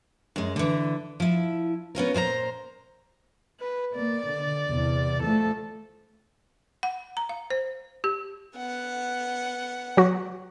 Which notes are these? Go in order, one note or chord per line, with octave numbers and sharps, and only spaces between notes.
F#2 G#3
D3 E3
F3 E4
B3 C#4 F4 A#4
A#2 C5 D5 A#5
B4
A#3 D5
D3
E2 C3
F3 A3 A4
F#5
A#5
F5
C5
G4
B3 F#5
F#3 F#4